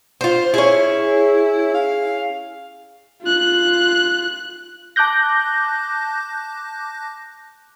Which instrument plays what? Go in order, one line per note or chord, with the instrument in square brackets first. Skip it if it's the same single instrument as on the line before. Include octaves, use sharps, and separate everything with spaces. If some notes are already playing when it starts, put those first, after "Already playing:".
[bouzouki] F4 C5
[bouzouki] C#4 G#4 [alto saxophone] E4
[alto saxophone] F5
[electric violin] F4 F#6
[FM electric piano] A5 D6 F#6 G6 A#6